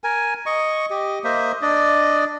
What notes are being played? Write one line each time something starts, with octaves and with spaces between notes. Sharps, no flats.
A#4 G#5
D#5 C#6
G4 D#5
A#3 C5 D#5 E5
D4 D5 D#5